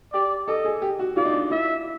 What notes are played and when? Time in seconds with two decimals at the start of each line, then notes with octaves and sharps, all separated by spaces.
0.13 G4 D5
0.47 A4 D#5
0.65 G#4
0.82 G4
0.99 F#4
1.17 F4 D5
1.25 D#4
1.33 D4
1.51 E4 E5